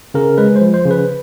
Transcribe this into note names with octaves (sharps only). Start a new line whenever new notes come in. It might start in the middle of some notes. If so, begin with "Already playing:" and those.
C#3 A#4
G#3 B4
C5
F3
C5
C#3
B4